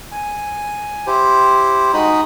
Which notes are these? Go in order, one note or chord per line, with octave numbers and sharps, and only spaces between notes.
G#5
E4 G4 C5
G#3 D#4 F#4 D#5 B5 D#6